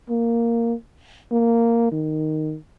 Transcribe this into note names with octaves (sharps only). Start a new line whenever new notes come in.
A#3
A#3
D#3